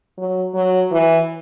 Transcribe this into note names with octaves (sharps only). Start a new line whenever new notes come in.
F#3
F#3
E3